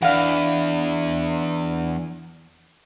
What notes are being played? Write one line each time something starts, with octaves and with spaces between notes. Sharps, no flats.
E2 D4 D5 F5 F#5